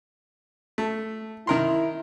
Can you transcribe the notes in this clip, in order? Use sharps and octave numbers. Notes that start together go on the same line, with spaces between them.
A3
D#3 E4 A#4 C6